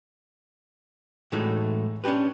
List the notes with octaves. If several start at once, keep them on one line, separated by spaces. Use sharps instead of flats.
A2 E3 G#3 A3 D#4 F#4
C#4 D4 F#4 G4 B4